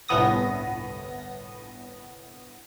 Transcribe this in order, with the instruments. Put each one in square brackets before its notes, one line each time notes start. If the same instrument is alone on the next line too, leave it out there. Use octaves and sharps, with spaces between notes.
[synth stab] G1 C2 A2 B3 D#6 A#6